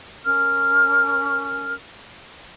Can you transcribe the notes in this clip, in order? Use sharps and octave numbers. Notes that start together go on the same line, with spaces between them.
C#4 A#4 F6